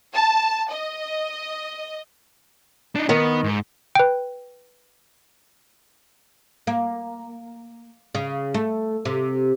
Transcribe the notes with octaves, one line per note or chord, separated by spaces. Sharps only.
A5
D#5
D4 D#4
D#3 B3
G#2
B4 G5
A#3
C#3
A3
C3